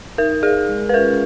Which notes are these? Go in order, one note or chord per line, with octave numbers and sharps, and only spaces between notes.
D#4 A#4
G#4 A#4 F5
G#3
B4
C#4 F4 A#4